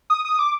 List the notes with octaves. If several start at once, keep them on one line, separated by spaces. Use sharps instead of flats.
D#6
D#6
D6